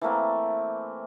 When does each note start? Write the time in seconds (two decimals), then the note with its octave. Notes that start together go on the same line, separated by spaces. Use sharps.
0.01 E3 A3 A#3 C4